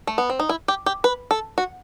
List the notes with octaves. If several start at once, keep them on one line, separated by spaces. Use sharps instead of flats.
A3
B3
C4
D#4
E4
G4
G4
B4
A4
F#4